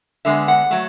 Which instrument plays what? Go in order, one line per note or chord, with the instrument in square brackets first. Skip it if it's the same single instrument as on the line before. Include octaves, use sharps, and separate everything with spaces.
[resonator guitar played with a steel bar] D3 G#3 B3 E5
F#5
F#3 A3